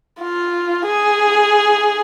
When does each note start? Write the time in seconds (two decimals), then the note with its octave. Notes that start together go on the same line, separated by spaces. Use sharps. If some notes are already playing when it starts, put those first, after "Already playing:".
0.21 F4
0.86 G#4